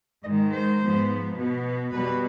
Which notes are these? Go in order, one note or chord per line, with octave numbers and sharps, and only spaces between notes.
G#2 D#3 G#3 D#5
C5
G#2 F3 B3
B2 B3
B2 G3 B3 B4